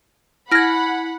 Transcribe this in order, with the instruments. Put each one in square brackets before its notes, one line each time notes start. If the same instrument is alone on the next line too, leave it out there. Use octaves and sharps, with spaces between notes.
[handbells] E4 G#6 [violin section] F#5 B5 [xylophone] F6 A#6